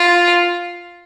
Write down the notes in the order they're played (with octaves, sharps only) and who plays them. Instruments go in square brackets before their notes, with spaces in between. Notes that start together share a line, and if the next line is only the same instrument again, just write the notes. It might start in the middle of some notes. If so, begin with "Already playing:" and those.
Already playing: [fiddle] F4